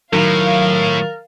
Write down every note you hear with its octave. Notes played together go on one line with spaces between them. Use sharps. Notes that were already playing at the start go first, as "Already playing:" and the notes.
A2 D#3 F#3 A#4 F5